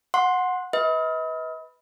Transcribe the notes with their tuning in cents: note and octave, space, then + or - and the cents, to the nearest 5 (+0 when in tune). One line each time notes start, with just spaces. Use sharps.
F#5 -15 C6 +10
B4 +0 D#5 +40